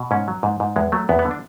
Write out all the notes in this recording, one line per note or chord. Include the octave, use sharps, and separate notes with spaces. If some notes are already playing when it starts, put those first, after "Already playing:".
Already playing: B2
G#2 C#4
F#3
G#2
G#2
E2 G#3
F#3 A3
E2 B3
B3
D3
D4